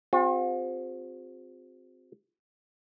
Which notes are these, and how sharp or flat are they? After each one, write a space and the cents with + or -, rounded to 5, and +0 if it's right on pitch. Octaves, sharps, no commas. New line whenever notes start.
C4 -5 F4 +45 G#4 -35